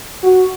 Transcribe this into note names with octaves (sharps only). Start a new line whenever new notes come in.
F#4